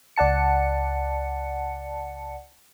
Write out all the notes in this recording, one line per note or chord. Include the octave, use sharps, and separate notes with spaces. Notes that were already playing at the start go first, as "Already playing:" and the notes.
C#2 D5 F#5 A5 C#7